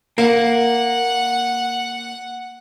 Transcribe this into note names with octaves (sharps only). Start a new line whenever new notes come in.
A#3 F#5